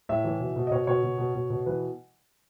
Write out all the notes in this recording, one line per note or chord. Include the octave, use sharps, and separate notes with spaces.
A2 E5
E3
B2
B2
D#5
B2 C#5
B2 C#5
B2
B2
B2
B2
E3 B4